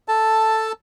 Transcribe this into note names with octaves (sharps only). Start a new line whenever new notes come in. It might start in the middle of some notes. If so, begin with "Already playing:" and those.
A4 A5